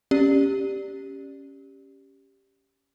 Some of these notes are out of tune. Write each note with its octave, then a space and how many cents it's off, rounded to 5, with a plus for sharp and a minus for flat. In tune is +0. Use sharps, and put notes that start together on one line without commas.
C#4 +0 G4 +0 D5 +0